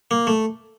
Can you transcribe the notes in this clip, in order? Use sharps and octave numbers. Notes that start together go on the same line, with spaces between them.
A#3
A3